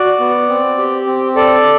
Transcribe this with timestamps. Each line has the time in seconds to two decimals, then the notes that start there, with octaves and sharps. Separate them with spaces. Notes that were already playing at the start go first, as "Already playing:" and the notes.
Already playing: F#4 D5
0.20 B3
0.49 C4
0.78 G4
1.06 C4
1.36 A4 D5